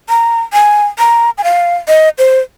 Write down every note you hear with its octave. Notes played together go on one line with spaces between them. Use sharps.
A#5
G#5
A#5
G#5
F5
D#5
C5